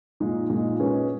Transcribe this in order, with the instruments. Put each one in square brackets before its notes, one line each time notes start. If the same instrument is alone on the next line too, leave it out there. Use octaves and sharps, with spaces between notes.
[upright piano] A#2 G#3 D#4
A#2 G#3 D#4
G#3 C#4 G#4 B4